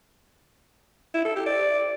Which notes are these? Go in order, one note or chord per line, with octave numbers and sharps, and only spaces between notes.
E4
A4
G4
D5